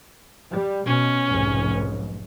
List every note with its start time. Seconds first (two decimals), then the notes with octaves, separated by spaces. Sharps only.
0.52 G3
0.86 B2 C#4
1.29 F1 B1 G#2